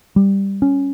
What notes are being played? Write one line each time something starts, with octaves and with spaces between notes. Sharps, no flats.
G3
C#4